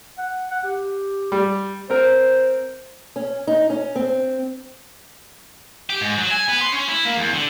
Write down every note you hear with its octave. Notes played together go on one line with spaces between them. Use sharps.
F#5
F#5
G4
G3
C4 A#4 C5
C#4
D#4
C#4
C4
G4
G#2
F#3
G#5
B3
C6
C#4
E4
A#3
E2
D3